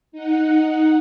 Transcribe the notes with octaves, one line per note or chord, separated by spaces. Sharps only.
D#4 F#5